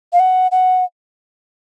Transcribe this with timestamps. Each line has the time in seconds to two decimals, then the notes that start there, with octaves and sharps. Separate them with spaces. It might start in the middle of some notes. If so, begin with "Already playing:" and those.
0.13 F5
0.20 F#5
0.52 F#5